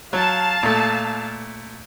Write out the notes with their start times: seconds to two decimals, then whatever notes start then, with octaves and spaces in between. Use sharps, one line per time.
0.13 F#3 F5 A5
0.63 A#2 A3